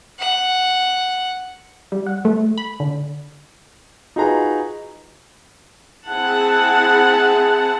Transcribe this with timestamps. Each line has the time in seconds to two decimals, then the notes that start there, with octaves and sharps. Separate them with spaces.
0.20 F#5
1.92 G3
2.06 F#5
2.25 A3
2.58 B5
2.80 D3
4.16 D#4 F4 F#4 G#4 B4 A#5
6.08 C4 E4 G#4 F#5 A5